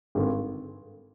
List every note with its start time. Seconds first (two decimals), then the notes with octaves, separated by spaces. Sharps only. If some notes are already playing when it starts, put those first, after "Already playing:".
0.15 G#1 G2 D3